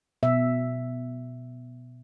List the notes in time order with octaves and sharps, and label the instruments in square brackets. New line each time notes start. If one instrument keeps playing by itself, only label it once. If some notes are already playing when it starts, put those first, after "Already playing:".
[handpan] B2 E5